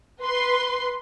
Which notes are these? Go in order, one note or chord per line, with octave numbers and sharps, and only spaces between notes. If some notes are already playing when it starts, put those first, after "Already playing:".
B4 C6